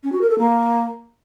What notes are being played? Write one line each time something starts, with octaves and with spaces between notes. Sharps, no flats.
C#4
F#4
A#4
A4
A#3